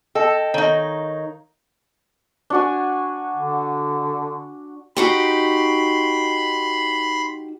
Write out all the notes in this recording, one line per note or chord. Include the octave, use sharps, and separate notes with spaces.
A4 D#5 G5
D#3 D#4 C#5 D#5 F5
D4 F#4 G#5
D3
D#4 F#4 G4 B5 C6